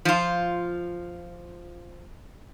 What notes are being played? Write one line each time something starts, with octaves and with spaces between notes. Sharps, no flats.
F3 F4